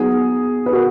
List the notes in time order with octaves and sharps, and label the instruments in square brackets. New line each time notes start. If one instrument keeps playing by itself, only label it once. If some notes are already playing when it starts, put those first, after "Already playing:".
Already playing: [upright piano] F#3 B3 D#4 G#4
B4
F#4 A#4